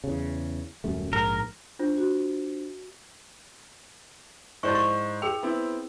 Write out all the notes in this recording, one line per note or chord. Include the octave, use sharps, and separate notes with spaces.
E2 C#3
D#1 F#2 A3
A#1 G#2 A#4
D4 F4 C5
F#4
G#2 E4 C5 D5 C#6 G6
C#6
G#4 G5 E6 F7
B3 C4 E4